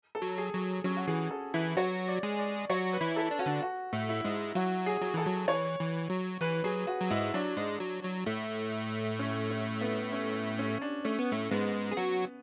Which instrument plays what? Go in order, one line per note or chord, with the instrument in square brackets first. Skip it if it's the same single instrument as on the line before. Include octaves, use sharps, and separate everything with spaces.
[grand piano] A4
[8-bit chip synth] F#3
[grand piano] G#4
[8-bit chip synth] F#3
[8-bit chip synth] F#3 [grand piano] C#4
[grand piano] F#4
[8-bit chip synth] E3 [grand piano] G#4
[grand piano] A4
[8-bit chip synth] E3 E4 [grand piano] B4
[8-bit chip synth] F#3 F#4 [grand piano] C#5
[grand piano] D5
[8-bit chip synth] G#3 G#4
[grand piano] D5
[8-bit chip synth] F#3 F#4 [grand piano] C#5
[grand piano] B4
[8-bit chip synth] E3 E4
[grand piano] A4
[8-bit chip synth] D4
[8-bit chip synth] C#4 [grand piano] F#4
[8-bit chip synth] D3 D4
[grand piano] F#4
[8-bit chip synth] A2 A3
[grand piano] E4
[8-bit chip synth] G#2 G#3
[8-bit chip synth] F#3 [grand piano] F#4
[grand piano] G#4
[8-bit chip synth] F#3
[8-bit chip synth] E3 [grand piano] A4
[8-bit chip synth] F#3
[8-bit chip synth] E3 [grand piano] C#5
[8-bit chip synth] E3
F#3
[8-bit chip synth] E3 [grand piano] B4
[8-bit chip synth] F#3 [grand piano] G#4
[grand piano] F#4
[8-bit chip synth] F#3
[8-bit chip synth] G#2 G#3 [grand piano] E4
[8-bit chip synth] F#3 [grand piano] D4
[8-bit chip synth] G#2 G#3
F#3
F#3
A2 A3
[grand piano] C#4
C#4
B3
C#4
C#4
D4
[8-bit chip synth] A3 [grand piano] C#4
[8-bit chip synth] B3
A2 A3
[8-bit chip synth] G#2 G#3 [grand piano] B3
[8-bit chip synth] G#4
F#3 F#4